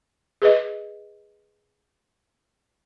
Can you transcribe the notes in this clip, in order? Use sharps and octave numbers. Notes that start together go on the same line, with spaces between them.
G#4 B4 D#5